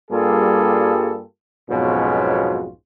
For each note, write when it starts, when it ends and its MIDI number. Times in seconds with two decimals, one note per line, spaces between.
0.11 1.22 43
0.11 1.22 55
0.11 1.22 58
0.11 1.22 65
0.11 1.22 68
0.11 1.22 69
1.70 2.69 35
1.70 2.69 41
1.70 2.69 44
1.70 2.69 47
1.70 2.69 61
1.70 2.69 65